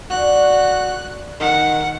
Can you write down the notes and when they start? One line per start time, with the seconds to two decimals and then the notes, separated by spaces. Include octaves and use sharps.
0.10 F#4 D5 F#6
1.40 D#3 F#5